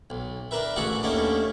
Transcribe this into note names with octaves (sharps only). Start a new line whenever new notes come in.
B1
D4 A#4 B4 E5
A1 F#4 G#4 D5 E5 F#5
D#2 A3 B3 C#4 D4 D#5